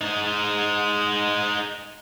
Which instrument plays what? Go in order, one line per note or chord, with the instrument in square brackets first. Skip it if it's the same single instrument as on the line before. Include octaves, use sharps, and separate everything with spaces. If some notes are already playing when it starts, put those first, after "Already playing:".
[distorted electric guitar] G#3 D#4